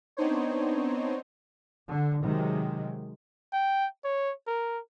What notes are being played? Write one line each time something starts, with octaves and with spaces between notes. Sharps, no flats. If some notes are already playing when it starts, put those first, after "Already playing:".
B3 C4 D4 D#4 C5 C#5
D3
C3 D#3 F#3 G#3
G5
C#5
A#4